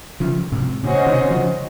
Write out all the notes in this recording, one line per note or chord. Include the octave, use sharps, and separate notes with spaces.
C#3 F3
G#2 C3
A#2 C#3 C#4 F#4 C5 D#5
C3 D#3
C#3 F3